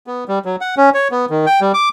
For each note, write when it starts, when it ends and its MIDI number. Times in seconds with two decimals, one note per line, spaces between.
0.07 0.24 59
0.28 0.39 55
0.45 0.56 54
0.61 0.75 78
0.77 0.90 61
0.94 1.08 73
1.11 1.25 59
1.30 1.46 51
1.46 1.60 79
1.61 1.72 55
1.74 1.89 86